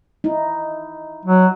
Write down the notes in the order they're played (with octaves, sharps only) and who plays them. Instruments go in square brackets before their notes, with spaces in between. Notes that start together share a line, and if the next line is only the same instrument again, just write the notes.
[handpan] D#4 E4
[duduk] F#3